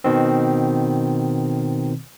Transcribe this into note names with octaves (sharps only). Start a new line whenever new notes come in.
B2 D#3 C4